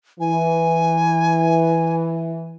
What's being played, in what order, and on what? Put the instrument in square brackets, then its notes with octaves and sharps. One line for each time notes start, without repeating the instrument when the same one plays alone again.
[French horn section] E3 [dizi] G#5